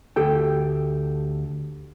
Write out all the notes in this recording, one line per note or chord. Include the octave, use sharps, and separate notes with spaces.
D2 G4 A4 G5